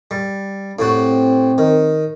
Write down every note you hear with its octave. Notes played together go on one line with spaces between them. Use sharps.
G3
A2 C3 C4 F#4
D#3